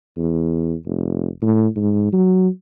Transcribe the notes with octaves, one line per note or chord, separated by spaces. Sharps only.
E2
F1
A2
G#2
F#3